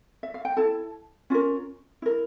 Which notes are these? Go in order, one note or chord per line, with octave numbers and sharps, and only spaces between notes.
E5
F5
G5
E4 A4 A5
C#4 F4 A#4
E4 A#4